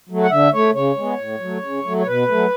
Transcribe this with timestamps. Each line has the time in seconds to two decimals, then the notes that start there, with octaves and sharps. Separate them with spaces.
0.09 F#3 A3
0.23 F#5
0.30 D3 E5
0.53 A3 C#5
0.74 C#3 C#5
0.96 G#3 B3
1.18 A2
1.40 F#3 A3
1.62 C#3
1.85 F#3 A3
2.00 C#5
2.06 B2 B4
2.28 F#3 A3